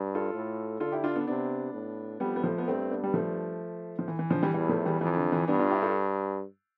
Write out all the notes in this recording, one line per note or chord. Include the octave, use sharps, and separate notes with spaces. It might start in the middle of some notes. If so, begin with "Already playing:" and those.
Already playing: G2
F4 A4
A2
D3 F4 A4
E4 G4
D4 F4
B3 D4
C3 B3 D4
A2
F2 G3 B3
B3
F3 A3
B3
G2 A3 C4
B3 D4
G3
F3 A3
F3
E3
E3
D3 F3
E3 G3
E2 E3 G3
F3 A3
E3 G3
F2 E3
D3
E3
G2 B3 D4
D4 F4
E4 G4
F4 A4